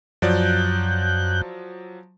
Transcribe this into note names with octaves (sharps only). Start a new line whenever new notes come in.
F#2 F3 F#3 D5 F#6 G6